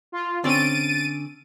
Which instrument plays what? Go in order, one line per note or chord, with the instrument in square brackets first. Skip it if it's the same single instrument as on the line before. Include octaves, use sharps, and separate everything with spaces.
[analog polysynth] F4
[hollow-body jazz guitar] D3 C4 C#4 [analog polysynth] A6 D7 D#7